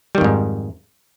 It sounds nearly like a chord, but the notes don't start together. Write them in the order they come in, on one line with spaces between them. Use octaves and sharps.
G3 D#3 F2 G#2